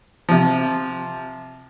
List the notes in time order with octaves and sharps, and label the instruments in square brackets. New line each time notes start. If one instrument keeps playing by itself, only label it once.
[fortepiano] C3 F3